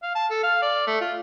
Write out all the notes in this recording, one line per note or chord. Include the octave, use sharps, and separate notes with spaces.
F5
A5
A4
F5
D5
A3
F4